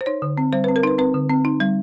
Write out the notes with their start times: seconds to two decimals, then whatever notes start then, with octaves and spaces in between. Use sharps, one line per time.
0.01 C5
0.06 D#4 C#5
0.22 D3
0.38 C4
0.53 G3 C5
0.64 C4 B4
0.76 A#4
0.83 D#4 B4
0.98 C4 B4
1.14 D3
1.30 C4
1.45 D#4
1.60 G3